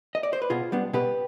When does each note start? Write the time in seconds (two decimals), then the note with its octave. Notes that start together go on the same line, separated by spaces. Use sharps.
0.15 D#5
0.23 D5
0.33 C5
0.42 B4
0.50 B2 F4 G#4
0.72 G3 B3 D4
0.93 B2 G4 B4